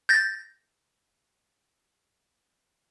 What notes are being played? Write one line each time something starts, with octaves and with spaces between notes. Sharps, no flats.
G6 A6 A#6